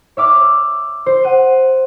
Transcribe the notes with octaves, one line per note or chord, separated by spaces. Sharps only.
C#5 E5 D6 F6
C5
F#5 D#7